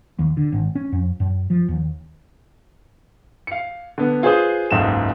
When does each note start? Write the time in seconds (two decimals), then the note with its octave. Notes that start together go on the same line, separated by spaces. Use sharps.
0.19 D#2
0.37 D3
0.52 G#1
0.75 C#4
0.92 F2
1.20 F#2
1.50 F3
1.68 D#2
3.47 F5 C#7
3.98 D3 B3
4.23 F4 G#4 B4 C5 D#6
4.71 F#1 C#2 G#2 A3 E7